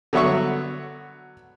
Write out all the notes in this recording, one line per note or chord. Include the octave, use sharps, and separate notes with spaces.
D3 F#3 B3 E5 C#6